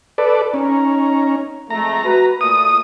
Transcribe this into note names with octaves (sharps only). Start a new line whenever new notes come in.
A4 B4 D5
C#4 D#4 A#5
F2 G#3 A3 A#5
F#4 B4
A#2 A3 D#6